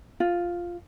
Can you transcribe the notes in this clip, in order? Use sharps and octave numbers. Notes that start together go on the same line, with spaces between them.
F4